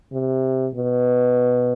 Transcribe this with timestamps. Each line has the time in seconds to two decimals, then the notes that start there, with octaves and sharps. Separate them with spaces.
0.12 C3
0.75 B2